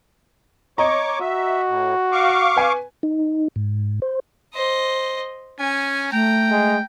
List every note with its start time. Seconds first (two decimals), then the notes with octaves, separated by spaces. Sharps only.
0.78 C#5 D#5 A#5 C#6 D6
1.21 F#4 E5
1.68 A2
2.12 F5 C#6 D6
2.56 B4 G#5
3.03 D#4
3.56 G#2
4.02 C5
4.53 C5 D#5
5.60 C#4 G#5
6.12 A3 G5 A#5
6.50 G#3